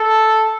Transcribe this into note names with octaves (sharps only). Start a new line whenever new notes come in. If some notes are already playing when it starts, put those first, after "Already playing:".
Already playing: A4